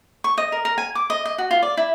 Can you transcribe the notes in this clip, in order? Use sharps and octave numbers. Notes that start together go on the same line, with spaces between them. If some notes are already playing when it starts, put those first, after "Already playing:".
C#6
D#5
A#4
A#4
G#5
D6
D#5
D#5
F#4
F4
D5
E4